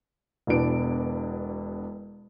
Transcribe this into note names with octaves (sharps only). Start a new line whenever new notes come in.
E1 E2 B2 D4 D7